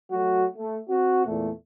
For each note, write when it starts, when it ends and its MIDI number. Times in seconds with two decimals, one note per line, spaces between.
0.11 0.44 54
0.11 0.44 57
0.11 0.44 66
0.56 0.76 57
0.88 1.25 60
0.88 1.25 66
1.27 1.50 40
1.27 1.50 46
1.27 1.50 57